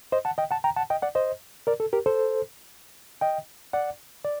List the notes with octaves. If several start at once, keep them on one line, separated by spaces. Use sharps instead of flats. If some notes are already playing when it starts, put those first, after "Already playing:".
C5 D#5
F#5 A5
D#5 G5
F#5 A5
G5 A#5
F#5 A5
D#5 G5
D5 F#5
C5 D#5
A#4 D5
A4
G4 A#4
A4 C5
D#5 G5
D5 F#5
D5